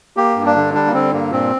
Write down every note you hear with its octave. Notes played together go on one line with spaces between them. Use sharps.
A#3 G4
G2
D4
D3
G3 D4
A#3
D3 C4
G2 A#3
A#2 C4